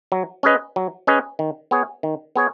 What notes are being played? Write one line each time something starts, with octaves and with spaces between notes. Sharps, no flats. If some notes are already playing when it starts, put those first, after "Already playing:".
F#3
C#4 G#4 B4 D#5
F#3
C#4 G#4 B4 D#5
D#3
B3 G#4 C#5
D#3
B3 G#4 C#5